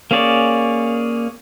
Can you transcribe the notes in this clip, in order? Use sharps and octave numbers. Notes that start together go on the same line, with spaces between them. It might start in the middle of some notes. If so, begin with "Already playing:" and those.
A#3 C#4 G#4 C#5 D5